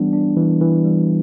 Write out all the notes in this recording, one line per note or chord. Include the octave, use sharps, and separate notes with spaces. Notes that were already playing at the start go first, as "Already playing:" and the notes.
Already playing: E3 G3 B3 D4
D4
E3
E3
G3